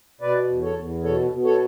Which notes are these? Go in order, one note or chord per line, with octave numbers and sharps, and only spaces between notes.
B2 B4 D5
E2
A4 C#5
E2
B2 A4 C#5
B2
A4 C#5